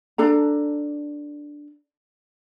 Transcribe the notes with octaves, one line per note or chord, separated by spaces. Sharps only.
D4 A4 A#5